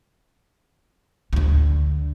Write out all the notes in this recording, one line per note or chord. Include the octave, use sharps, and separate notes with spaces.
D2 D3